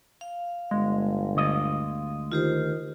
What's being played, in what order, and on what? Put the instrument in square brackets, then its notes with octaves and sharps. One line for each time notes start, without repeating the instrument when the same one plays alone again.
[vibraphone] F5
[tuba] G1 [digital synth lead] G#3
[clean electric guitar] D2 D#5
[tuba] D#3 [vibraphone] F4 G4 C5